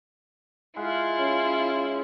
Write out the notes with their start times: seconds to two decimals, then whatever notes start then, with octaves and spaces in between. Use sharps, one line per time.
0.76 G#3 E4 F4 F5 F#5
1.18 C#3